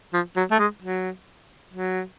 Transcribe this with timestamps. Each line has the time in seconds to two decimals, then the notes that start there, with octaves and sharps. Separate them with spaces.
0.14 F3
0.36 F#3
0.51 A3
0.59 G#3
0.82 F#3
1.73 F#3